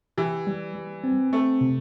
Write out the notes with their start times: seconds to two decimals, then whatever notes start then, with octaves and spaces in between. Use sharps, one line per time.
0.18 E3 G4
0.47 G3
0.75 G3
1.04 C4
1.33 A3 C4
1.61 C3